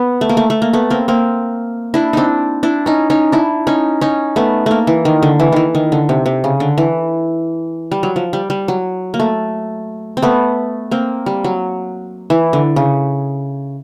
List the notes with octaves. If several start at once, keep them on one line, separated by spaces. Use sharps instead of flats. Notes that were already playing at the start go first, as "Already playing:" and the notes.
Already playing: B3
A3
A#3
A3
A3
A#3
A3 B3
A#3 C4
A#3 C4
D4 E4
C4 D4 D#4
D4 E4
C#4 D#4
C#4 D#4
D4 E4
C#4 D#4
C#4 D#4
A3 B3
A3 A#3
E3
D#3
D3
E3
D#3 E3
D#3
D3
C3
C3
C#3
D3
E3
G3
F#3
F3
G3
G3
F#3
A#3
A3
C4
A3 B3
A#3 C4
G3
F#3
E3
D3
C#3